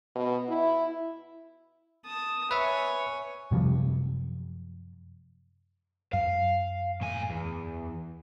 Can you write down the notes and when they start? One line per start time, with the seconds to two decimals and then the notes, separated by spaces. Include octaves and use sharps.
0.15 B2
0.49 E4
2.05 A5 D#6
2.51 B4 C#5 E5 G#5
3.51 F#2 C3 F3 G3
6.13 F#2 F5
7.01 A2 G#5
7.30 E2